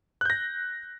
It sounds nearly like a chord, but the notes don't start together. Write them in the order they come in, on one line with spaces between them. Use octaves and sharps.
F#6 G6 A#6